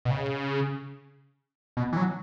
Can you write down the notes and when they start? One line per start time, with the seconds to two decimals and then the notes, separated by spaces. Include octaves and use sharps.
0.05 B2
0.11 C#3
1.77 B2
1.92 E3
1.97 F#3